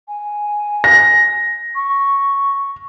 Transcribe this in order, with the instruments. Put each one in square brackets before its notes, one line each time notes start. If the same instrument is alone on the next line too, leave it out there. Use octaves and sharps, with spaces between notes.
[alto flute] G#5
[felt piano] A#6
[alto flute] C#6